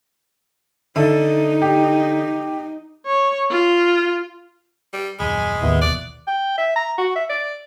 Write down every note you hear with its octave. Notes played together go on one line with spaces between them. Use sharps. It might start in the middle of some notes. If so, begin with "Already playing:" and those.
D3 D#4 A4 E5 E6
G4
C#5
F4
G3
D#1 A#1 F#2 G#3 G#5 B5
A1 D#2 A2 D3 D#3 B3 E4
E1 E2 B2 D5 F#6
G5
E5
A#5
F#4
E5
D5